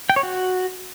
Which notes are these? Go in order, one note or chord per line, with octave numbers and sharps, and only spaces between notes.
G5
C#5
F#4